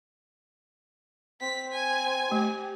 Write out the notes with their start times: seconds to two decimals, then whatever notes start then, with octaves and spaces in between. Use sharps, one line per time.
1.41 C4 B6
1.72 G#5
2.32 A3 G4